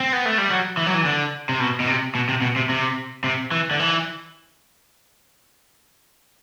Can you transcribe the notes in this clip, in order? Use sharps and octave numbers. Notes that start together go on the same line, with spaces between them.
C4
B3
A3
G3
F#3
E3
F#3
E3
D3
C3
B2
B2
C3
B2
C3
B2
C3
C3
C3
E3
D3
E3